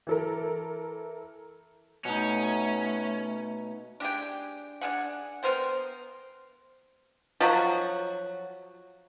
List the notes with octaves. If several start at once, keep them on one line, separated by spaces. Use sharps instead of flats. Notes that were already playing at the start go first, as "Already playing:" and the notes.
E3 A4 A#4
B2 A3 C#4 D#4
D4 G4 G#4 G5
D4 G#4 F#5
B3 A#4 C5 G5
F3 F#3 F#4